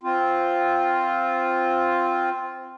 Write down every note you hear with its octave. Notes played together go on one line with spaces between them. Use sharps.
C4 F4